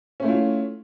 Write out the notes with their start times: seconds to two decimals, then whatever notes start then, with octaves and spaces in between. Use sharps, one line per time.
0.20 C#4
0.23 A3
0.25 E4
0.28 F4